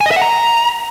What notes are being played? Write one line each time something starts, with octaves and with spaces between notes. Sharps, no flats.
G#5
D#5
E5
F#5
A#5